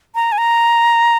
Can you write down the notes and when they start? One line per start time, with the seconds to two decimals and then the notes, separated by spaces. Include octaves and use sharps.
0.15 A#5
0.32 G#5
0.38 A#5